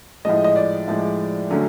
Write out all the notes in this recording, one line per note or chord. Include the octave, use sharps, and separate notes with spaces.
A2 F3 G#3 D#5
D#5
D5
A2 F3 G#3
D3 F#3 A3 C#4